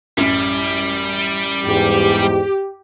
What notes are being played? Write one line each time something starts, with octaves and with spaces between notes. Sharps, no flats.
A1 F#2 G3 B6
E2 G#2 G4